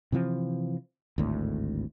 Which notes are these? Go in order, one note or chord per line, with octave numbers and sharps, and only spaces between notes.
C3 E3 F3 C4
G#1 D2 A2